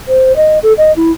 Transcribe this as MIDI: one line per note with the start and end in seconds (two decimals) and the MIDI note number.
0.08 0.36 72
0.36 0.59 75
0.63 0.73 69
0.78 0.94 75
0.96 1.12 64